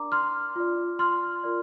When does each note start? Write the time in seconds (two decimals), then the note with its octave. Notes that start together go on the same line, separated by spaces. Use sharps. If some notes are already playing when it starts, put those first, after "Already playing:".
Already playing: D4 A#4 D5 A#5 D6
0.12 C6 F6
0.56 F4 D5
0.99 C6 F6
1.44 F4 A#4 D5